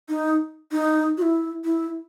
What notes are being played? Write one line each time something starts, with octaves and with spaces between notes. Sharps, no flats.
D#4
D#4
F#4
E4
E4